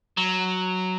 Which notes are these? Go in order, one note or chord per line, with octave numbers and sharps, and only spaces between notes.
F#3